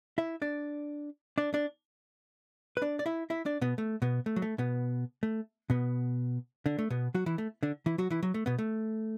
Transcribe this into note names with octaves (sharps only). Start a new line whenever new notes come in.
E4 E5
D4 D5
D4 D5
D4 D5
B4
D4 D5
D5
E4 E5
E4 E5
D4 D5
B2 B3
A3
B2 B3
A3
F#3
A3
B2 B3
A3
B2 B3
D3 D4
A3
B2 B3
F#3 F#4
E3 E4
A3
D3 D4
E3 E4
F#3 F#4
E3 E4
F#3
A3
B2 B3
A3